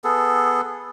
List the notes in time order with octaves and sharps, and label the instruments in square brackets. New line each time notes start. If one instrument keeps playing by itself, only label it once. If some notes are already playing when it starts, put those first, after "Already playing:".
[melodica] B3 G#4 A4